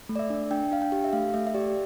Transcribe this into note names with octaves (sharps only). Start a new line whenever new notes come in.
A3
D5
E5
D4
D4 G5
D4 F5
G5
G4
E5
A3 F5
A3 E5
E5
G4 D5